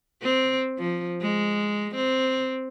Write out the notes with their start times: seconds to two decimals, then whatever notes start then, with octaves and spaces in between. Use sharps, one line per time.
0.22 C4
0.78 F3
1.21 G#3
1.96 C4